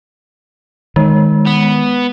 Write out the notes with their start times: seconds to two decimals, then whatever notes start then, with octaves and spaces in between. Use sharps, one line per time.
0.96 D#3 G#3
1.47 B3